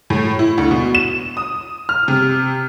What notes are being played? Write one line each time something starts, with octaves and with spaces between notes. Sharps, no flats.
A2
E4
D2
B2
E7
D#6
F6
C3